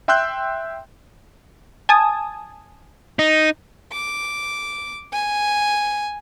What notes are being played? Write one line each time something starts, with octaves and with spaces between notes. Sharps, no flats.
E5 G5 C6 E6 F#6 G6
G#5 A5 D#6
D#4
D6
G#5